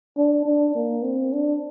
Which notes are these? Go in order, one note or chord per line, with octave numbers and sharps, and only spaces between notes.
D4
D4
A#3
C4
D4